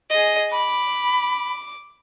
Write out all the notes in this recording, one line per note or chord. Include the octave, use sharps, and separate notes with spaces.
G#4 D#5
B5 D6